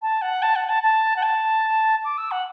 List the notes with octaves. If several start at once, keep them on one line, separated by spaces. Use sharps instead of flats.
A5
F#5
A5
F#5
A5
A5
F#5
A5
D6
E6
F#5